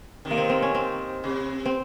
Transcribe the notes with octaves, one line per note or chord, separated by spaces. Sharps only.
C3 D#3
A#3
C4
C4
C#4
C4
C3
C4